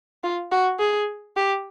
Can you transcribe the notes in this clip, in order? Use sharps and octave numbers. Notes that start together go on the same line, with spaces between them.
F4
F#4
G#4
G4